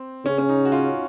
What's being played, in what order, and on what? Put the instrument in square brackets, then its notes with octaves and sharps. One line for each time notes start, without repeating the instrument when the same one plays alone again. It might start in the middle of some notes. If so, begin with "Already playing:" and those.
Already playing: [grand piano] C4
[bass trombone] C#3 [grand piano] C#4
[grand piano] C#4
D#4
F#4
F4